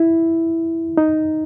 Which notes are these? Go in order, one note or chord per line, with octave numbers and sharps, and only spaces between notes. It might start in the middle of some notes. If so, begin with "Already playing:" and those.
Already playing: E4
D#4